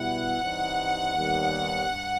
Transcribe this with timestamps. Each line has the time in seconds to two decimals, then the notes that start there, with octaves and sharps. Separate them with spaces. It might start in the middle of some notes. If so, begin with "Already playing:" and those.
Already playing: B2 G3 B3 E4 F#5
0.41 G2 E3 G3 C4 D#4
1.15 D#2 D#3 G3 B3
1.89 G2